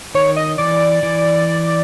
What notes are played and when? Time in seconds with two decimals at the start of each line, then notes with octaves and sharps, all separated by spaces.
0.15 D#3 C#5
0.36 D#5
0.58 E3 D5
1.03 E3